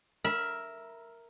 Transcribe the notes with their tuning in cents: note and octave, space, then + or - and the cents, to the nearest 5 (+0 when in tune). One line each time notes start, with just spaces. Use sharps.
A#4 +0 E5 +0 B5 -30